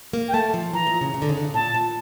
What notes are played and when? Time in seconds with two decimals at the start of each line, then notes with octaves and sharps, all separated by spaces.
0.13 A#3
0.28 G5
0.34 A3 A5
0.54 F3
0.74 E3 A#5
0.87 A#2
1.01 C#3
1.14 C#3
1.22 D3
1.29 C#3
1.37 D3
1.45 C#3
1.54 A#2 A5
1.74 A#2